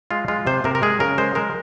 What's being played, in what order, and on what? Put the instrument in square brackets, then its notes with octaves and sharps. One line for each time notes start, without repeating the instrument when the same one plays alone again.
[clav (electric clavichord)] G#3 F4
G#3 F4
C3 C5
C3 A#4
A#4
G#3 G#4
C#3 A#4
G#3 C5
G#3 A#4